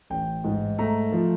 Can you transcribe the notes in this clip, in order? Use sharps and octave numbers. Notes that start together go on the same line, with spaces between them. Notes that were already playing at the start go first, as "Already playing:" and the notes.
A1 G5
G#2
A3 A#5
F3